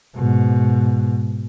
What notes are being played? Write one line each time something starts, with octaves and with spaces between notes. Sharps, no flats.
G#2 B2